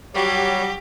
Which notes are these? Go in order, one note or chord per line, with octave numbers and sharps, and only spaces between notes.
F#3 G3 G4 C#5